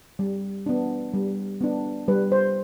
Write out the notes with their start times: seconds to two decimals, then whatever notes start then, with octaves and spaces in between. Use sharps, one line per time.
0.19 G3
0.66 B3 D4
1.14 G3
1.61 B3 D4
2.08 G3 B4
2.32 C5